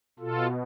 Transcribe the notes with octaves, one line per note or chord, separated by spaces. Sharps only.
B2 F4 A4